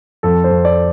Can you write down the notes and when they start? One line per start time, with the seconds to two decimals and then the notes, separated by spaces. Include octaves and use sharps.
0.23 F2 A4
0.44 C5
0.51 F2
0.65 D5